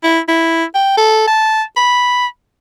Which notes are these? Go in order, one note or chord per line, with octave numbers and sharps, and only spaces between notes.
E4
E4
G5
A4
A5
B5